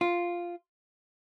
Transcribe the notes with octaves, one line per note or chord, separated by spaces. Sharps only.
F4